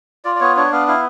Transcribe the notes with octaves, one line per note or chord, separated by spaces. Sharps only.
F4 D5
D5
B3 C#5
D4 C#5
B3 F5
E4 F5